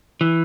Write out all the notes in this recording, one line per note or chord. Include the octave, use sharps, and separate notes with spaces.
E3